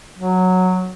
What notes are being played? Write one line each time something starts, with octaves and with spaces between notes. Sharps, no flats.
F#3